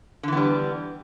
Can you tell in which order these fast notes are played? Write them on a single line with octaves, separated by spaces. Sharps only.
D3 E3 B3 G3